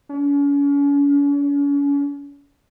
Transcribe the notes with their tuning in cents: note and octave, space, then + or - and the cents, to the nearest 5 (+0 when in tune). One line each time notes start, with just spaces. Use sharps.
C#4 +40